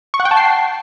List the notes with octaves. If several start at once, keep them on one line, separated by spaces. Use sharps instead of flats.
C#6
F#5
G5
A5
C7